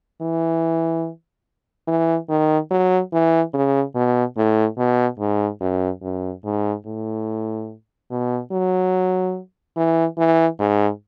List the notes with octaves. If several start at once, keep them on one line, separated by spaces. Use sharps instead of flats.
E3
E3
D#3
F#3
E3
C#3
B2
A2
B2
G#2
F#2
F#2
G#2
A2
B2
F#3
E3
E3
G#2